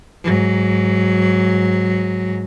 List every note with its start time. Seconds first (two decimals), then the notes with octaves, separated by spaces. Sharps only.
0.24 G#2 F#3